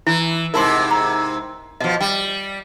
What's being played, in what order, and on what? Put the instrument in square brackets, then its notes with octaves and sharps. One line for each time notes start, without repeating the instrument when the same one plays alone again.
[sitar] E3 [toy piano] E4
[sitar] G#2 C3 E4 [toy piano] A#4 A5 C6
[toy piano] A#5
[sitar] B2 F3 [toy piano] D#5
[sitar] G3 [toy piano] G5